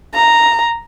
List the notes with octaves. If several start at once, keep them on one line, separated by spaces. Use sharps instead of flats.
A#5